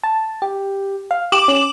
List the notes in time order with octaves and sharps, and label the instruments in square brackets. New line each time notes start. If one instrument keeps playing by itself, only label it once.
[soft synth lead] A5
G4
F5
[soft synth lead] G4 [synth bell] D6 E7 F#7
[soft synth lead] C#4